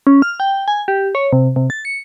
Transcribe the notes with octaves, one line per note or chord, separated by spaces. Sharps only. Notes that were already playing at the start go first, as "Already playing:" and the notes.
C#4
F6
G5
G#5
G4
C#5
C3
C3
A6
C#7